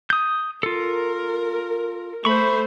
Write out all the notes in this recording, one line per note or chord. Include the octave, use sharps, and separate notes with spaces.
D#6 G6
F4 A4 A#4
A3 C5 B5 C#6